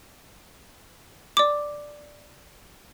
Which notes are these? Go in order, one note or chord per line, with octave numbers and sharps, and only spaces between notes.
D5 D6